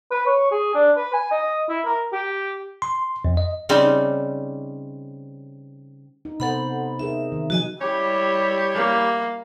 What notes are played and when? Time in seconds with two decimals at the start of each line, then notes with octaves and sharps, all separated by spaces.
0.11 B4
0.26 C#5
0.51 G#4
0.74 D4
0.96 B4
1.13 G#5
1.31 D#5
1.69 E4
1.86 A#4
2.13 G4
2.82 C6
3.25 F2
3.37 D#5
3.69 C#3 G3 C4 C#4 D#4
6.25 D#4
6.40 C3 B3 A4 C5 F#5 B5
6.99 D#4 G#4 A#4 E5
7.32 D#3
7.50 F3 F#3 F#4 D#5 G#5
7.81 G3 E4 G4 C#5
8.75 A#3